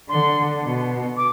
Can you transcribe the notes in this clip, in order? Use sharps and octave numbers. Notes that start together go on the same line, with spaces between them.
D3 C6
B2
D6